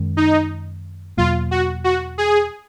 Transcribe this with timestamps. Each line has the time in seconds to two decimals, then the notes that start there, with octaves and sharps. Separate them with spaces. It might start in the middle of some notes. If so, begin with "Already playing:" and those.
Already playing: F#2 D#3 G#3
0.17 D#4
1.17 E2 B2 F#3 A#3 F4
1.51 F#4
1.84 F#4
2.18 G#4